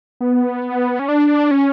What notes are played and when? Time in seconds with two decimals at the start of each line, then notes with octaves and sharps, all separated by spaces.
0.21 B3
0.99 C#4
1.09 D4
1.51 C#4